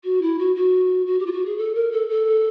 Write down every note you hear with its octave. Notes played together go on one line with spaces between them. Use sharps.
F#4
E4
F#4
F#4
F#4
G4
F4
F#4
G#4
A4
A#4
A4
A4